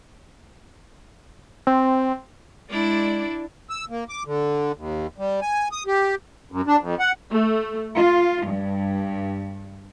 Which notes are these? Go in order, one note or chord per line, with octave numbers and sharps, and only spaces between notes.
C4
G#3 D4 E4 D5
E6
A#3
D6
D3
D#2
G3
G#5
D#6
G4
F#2
D4
F2
F#5
A3
F4
G2